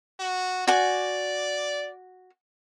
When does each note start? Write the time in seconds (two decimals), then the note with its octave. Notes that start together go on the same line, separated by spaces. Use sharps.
0.20 F#4
0.68 F#4 D5 G#5